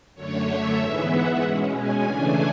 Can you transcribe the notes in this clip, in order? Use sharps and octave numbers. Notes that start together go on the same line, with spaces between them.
F#2 D3 A3 C#5
E5
G#2 E3 G#3 B3
F#5
B2 G#3 C#4
G#5
C#3 E3 A3 D4